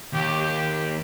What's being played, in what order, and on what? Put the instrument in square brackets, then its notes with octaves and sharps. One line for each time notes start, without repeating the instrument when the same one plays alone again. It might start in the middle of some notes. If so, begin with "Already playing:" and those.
[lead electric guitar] D#2 [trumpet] G4
[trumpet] G4